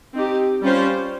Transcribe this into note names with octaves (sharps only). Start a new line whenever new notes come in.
C4 D#4 G4
G3 C#4 F4 C5